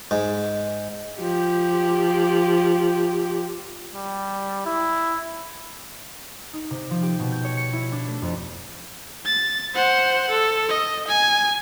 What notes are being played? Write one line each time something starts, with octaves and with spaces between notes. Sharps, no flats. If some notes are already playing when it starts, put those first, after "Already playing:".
G#2
F3 G4
G3
E4
D#4
C3
F3
G4
B2
G6
C#5
C#7
E4
D4
A3
F2
A6
C5 F#5
A4
D#5
G#5